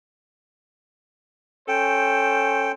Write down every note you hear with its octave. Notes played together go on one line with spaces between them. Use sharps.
C#4 A4 C5 G5